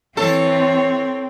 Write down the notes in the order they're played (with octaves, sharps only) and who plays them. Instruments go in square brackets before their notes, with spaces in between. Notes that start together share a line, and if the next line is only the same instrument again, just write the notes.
[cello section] E3 [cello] C4 [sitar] A4 [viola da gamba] C#5